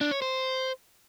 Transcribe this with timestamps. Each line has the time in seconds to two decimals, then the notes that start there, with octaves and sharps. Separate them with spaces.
0.01 D4
0.11 C#5
0.22 C5